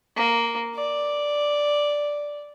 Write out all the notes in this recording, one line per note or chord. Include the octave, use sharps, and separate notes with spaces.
A#3
D5